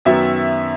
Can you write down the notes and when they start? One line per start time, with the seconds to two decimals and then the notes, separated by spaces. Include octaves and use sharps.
0.05 F#2 D#3 F#3 B3 E5